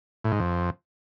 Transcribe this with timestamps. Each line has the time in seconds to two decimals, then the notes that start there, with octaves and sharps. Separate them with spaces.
0.24 A2
0.32 G#2
0.40 F2